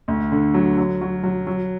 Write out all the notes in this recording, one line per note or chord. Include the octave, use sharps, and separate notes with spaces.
D2
D3
F#3
F#3
F#3
F#3
F#3